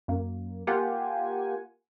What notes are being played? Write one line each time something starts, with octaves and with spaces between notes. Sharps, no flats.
F#2 A#3
A#3 F4 G4 F#5 G#5